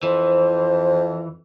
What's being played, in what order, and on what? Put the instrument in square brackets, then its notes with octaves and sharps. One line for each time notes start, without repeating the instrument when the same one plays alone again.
[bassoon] F2 [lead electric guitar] E3 [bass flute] C5